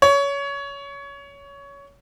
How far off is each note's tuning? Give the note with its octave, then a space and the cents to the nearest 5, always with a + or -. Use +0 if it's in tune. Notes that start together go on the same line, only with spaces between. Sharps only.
C#5 +20